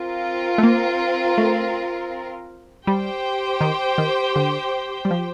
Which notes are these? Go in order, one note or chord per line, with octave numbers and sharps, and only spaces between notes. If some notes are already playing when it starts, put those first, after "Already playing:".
Already playing: C4 F4 A#4
A3
A#3
A3
G3 G4 C5 G5
D#3
D#3
D3
G3
F3